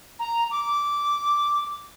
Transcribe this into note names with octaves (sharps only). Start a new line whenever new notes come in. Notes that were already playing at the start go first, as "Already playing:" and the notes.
A#5
D6